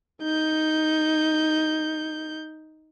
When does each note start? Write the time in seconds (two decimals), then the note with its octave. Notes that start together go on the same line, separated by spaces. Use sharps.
0.22 D#4 G6